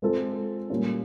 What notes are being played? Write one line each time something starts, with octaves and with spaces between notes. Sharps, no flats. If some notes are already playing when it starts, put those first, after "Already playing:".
G#3 C4 F4 A4
A#2 G3 A#3 C#4